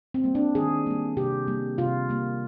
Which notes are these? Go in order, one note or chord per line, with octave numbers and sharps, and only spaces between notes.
C4
G3 A#3
D4
D#3 G#4
G3 A#3
C3 G4
G3 A#3
C3 F4
G3 A#3